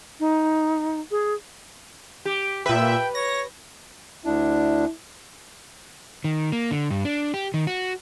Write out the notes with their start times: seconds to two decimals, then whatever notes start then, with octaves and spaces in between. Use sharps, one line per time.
0.20 D#4
1.11 G#4
2.25 G4
2.66 A#2 B4 E5 G5
3.15 C#5 A#6
4.25 D2 D4 E4
6.24 D#3
6.52 A#3
6.71 D3
6.90 G2
7.05 D4
7.34 G4
7.54 D#3
7.67 F#4